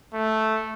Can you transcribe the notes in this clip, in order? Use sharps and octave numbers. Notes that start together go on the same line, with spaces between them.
A3